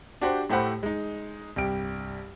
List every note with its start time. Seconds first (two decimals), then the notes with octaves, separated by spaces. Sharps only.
0.21 D4 F#4 G4 C5
0.50 A2 A3 G4 C5 F#5 B5
0.83 G#3 D#4
1.56 C2 G2 G4 D7